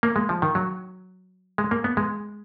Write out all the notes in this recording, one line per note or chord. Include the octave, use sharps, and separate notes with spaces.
A#3
G#3
F3
D#3
F#3
G#3
A#3
B3
G#3